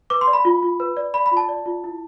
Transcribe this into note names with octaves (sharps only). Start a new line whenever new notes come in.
B4 D6
C6
D5
B5
F4
F4
B4
D5
D5 B5
B5
F4
A5
D5
F4
E4